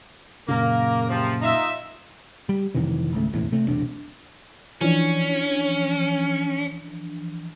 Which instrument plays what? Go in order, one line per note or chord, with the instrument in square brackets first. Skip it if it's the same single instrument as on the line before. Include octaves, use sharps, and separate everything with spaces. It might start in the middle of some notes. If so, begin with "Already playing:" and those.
[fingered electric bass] F#2 A#2 C#3 [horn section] A#3 A#4
[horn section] C3 F3
D#4 F4 E5
[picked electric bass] G3
F2 C3 D#3 E3
G#1 C#2 A3
F1 A#1 E2 A2
C3 A3
B1 E2 C3 D4
[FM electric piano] E3 F3 D4 [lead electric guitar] C#4